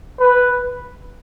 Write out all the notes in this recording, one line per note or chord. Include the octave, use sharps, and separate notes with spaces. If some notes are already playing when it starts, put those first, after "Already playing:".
B4